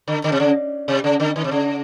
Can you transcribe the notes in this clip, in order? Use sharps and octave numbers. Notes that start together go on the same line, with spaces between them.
D3
D3
C3
C#3
C3
C#3
D3
D#3
C3
C#3